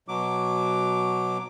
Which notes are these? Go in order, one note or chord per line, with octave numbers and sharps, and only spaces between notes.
B2 F#3 D6